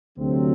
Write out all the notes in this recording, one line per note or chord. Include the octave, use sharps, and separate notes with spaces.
D2 C3 F#3 C4